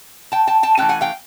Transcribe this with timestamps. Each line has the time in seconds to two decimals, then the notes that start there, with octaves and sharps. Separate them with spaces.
0.32 G5 A5
0.47 G5 A5
0.63 G5 A5
0.78 E3 A3 C#4 G5 A5
0.89 F#5 G#5
1.01 F5 G5